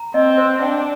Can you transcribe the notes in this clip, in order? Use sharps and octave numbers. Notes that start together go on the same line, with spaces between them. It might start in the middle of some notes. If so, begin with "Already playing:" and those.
Already playing: A#5
C4 D#5
C5
D4 G5